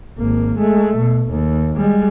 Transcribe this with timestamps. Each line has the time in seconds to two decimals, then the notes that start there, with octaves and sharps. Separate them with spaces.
0.18 G#1 A#3
0.59 G#3 A3
0.99 B2
1.31 D#2
1.76 G3 G#3